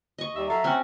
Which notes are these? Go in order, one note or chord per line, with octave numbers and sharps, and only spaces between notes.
D#5 C#6
D#2 G3 E5
F#3 A4 E5 F5 A#5
C4 C#4 F#4